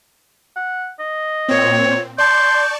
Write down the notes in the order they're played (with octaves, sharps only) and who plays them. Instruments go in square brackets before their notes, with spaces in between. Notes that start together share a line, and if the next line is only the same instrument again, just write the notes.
[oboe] F#5
D#5
[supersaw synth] A#2 C4 [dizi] C#5
[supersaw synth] D5 A5 C#6 [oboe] C6 [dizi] G6